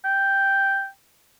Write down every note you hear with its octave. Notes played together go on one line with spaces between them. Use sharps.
G5